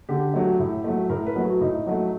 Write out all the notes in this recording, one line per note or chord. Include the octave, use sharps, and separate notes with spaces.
D3 G4
F#3 A3
A2
F#3 A3
A2 A#4
B4
F#3 A3
F#4
A2 D#4
F#3 A3